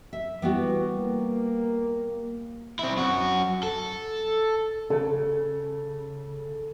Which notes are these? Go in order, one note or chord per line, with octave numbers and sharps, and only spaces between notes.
E5
E3 G3 B3 F#4
A#3
C4 E4
F#2 F#4
A4
C#3 A4